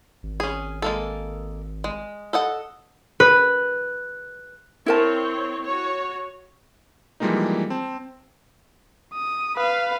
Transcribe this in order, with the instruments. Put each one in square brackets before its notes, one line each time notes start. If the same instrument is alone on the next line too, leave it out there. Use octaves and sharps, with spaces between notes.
[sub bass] G#1
[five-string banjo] C#4 G#4
G#3 A#3 A4
G#3
A4 D#5 F#5
[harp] B4
[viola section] C4 C#5 [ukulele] E4 A#4 A5
[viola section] F#4 C#5
[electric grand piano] E3 F3 G3 G#3 A#3 D#4
C4 A5
[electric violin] D#6
B4 F5